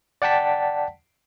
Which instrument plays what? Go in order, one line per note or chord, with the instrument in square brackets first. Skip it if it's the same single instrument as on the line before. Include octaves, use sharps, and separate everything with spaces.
[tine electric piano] D5 F#5 G5 A5 B6